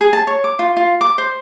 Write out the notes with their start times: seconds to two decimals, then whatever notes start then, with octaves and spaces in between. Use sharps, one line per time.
0.01 G#4
0.13 A5
0.27 C#5
0.44 D6
0.59 F4
0.77 F4
1.01 D6
1.18 C5